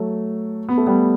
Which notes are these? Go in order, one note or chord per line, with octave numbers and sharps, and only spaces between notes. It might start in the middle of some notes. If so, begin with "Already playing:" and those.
Already playing: F#3 A3
B3
A3
G3 B3